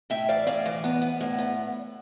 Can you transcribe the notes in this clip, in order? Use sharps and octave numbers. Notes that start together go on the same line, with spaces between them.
A2 E5 G5
E3 D5 F5
A2 D5 F5
E3
B3
B3
A2
B3